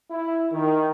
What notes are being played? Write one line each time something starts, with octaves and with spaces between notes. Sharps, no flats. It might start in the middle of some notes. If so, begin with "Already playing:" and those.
E4
D#3